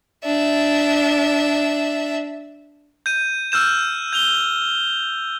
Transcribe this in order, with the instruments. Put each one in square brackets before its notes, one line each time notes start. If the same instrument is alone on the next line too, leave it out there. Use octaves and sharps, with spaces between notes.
[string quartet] D4 E5
[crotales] G6 D#7
E6 F6 G6 E7
G6 F7 G7